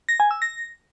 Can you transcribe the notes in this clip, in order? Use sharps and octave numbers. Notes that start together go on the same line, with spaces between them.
A#6
G#5
E6
A#6